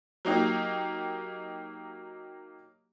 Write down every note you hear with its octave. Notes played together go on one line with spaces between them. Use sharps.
F#3 A#3 D#4 G4